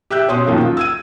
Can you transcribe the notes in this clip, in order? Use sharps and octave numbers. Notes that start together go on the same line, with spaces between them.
G4 E5 E6 F#6 G6
B2 C#4 C6 D#6
F#2 B2 D#3 F3 A#3
F4
E6 G#6 D#7